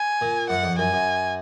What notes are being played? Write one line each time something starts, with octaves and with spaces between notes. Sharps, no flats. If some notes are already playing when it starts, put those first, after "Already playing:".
Already playing: G#5
A#2
F#2 F#5
F2
F#2 G#5
F#2